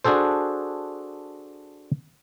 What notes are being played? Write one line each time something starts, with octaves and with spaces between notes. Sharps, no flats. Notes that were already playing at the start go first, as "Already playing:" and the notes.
D4 F#4 G#4 A4 C5